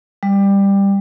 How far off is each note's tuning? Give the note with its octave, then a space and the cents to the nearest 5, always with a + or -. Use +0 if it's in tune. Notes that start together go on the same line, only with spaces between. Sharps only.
G3 +15